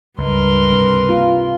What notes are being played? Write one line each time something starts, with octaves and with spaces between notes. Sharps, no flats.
C#2 G2 A#4 B4 C6
C3
A#3 F4